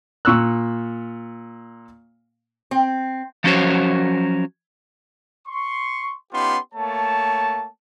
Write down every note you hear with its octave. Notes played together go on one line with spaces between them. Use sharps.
A#2 C#6 E6 F#6
C4
F3 F#3 C#4 F#4 C5 C#5
C6 C#6
B3 C#4 D#4 F4 G4 C6
A3 A#3 C#5 A5